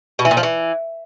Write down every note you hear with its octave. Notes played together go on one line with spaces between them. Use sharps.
B2
E3
A#2
F3
E3